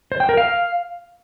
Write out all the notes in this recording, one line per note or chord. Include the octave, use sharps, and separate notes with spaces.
C5
G5
A#4
F5